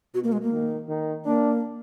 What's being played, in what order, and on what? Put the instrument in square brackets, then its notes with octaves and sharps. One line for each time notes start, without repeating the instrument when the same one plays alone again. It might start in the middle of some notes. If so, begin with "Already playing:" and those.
[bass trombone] B2 [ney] F#4
[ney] A#3
G#3
A#3
[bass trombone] D#3
D#3
[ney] A#3 [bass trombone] D4